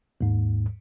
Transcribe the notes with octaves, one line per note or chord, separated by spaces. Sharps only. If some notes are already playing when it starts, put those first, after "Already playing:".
D#2 G#2